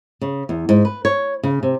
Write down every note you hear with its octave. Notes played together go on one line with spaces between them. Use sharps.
C#3
E2
G#2
B4
C#5
C#3
C3